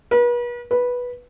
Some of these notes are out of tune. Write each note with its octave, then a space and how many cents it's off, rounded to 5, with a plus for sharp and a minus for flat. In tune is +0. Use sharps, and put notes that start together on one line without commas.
B4 -40
B4 -10